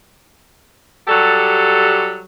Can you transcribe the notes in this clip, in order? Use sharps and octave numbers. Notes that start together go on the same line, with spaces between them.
F#3 G3 G4 A4